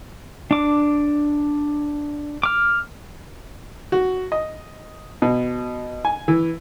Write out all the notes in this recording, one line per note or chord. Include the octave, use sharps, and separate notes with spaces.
D4 D6
D6 F6
F#4
D#5
B2
G#5
E3